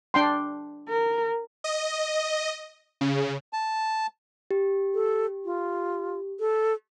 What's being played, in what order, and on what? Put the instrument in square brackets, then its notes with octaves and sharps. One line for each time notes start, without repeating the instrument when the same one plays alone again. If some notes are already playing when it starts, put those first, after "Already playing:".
[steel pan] D4 G5 C6
[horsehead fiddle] A#4
[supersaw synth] D#5
C#3
[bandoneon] A5
[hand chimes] G4
[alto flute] A4
F4
A4